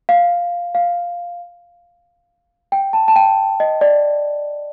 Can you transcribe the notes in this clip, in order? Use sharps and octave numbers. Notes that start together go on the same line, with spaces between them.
F5
F5
G5
A5
A5
G5
D#5
D5